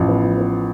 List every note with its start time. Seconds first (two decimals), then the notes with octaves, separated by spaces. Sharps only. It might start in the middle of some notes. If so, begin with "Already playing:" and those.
Already playing: A1 F3
0.09 B3
0.24 F3
0.38 B3